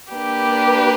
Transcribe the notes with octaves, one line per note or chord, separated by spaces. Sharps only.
A#3 D4 G4 B4